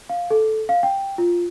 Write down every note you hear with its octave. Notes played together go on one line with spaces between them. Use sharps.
F5
A4
F5
G5
F4